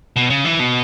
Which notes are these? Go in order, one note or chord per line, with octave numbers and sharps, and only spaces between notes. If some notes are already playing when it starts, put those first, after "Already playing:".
B2
C#3
E3
B2